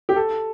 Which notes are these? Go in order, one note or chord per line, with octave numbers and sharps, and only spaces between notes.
G4
A4